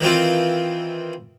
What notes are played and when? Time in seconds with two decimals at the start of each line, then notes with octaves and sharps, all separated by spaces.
0.01 D#3 E3 C4 F4